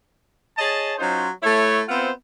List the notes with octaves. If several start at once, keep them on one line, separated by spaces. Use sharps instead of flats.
G#4 C#5 D#5 A5
F#3 C#4 D#4 F4 C5
A3 E4 C#5
B3 C4 F4 C5 E5 F#5